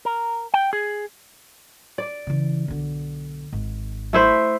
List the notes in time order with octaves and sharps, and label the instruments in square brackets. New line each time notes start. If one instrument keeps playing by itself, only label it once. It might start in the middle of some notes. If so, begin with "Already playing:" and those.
[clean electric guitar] A#4
G5
G#4
[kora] D5
[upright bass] C#3 E3
B1 D3
G#1 G#2
[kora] A3 E4 C5